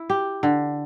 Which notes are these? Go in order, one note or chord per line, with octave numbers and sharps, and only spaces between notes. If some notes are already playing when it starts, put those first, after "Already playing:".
Already playing: E4
G4
D3